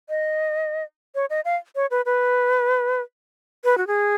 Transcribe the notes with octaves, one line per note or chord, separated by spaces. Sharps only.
D#5
C#5
D#5
F5
C#5
B4
B4
B4
F#4
G#4